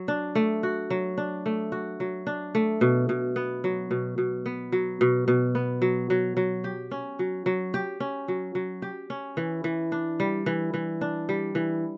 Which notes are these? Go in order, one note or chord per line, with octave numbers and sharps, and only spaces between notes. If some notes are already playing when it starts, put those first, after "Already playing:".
Already playing: F#3
D4
A3
F#4
F#3
D4
A3
F#4
F#3
D4
A3
B2
B2
B3
F#3
B2
B2
B3
F#3
B2
B2
B3
F#3
F#3
F#3
G4
C#4
F#3
F#3
G4
C#4
F#3
F#3
G4
C#4
E3
E3
D4
G3
E3
E3
D4
G3
E3